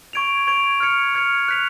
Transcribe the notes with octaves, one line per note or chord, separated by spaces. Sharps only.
C#6 G#6 D7 F7
C#6 G#6 D7 F7
F6 G#6 C#7 F7
F6 G#6 C#7 F7
F#6 B6 F7